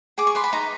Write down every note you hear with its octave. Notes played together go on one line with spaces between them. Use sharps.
G#4 D6
C#6
B4 C6
B5
D#4 A#5